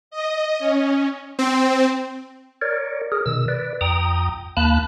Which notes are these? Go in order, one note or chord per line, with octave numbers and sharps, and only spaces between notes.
D#5
C#4
C4
A#4 C#5 D5
G#4 A#4
B2 D#3 E6
B4 D5
F2 G5 A#5 D#6
D#2 A#3 A5 B5 F#6